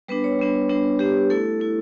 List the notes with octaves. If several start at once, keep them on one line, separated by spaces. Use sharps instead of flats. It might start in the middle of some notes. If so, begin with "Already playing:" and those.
G3 B3 D4 B4
C#5
G3 B3 D4
G3 B3 D4
G3 B3 D4 G4
A3 E4 A4
A3 E4